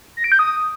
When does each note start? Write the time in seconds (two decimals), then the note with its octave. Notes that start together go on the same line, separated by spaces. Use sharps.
0.17 A#6
0.24 D7
0.32 G6
0.39 D#6